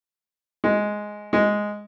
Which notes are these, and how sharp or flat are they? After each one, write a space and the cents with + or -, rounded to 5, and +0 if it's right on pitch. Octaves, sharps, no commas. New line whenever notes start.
G#3 +5
G#3 +0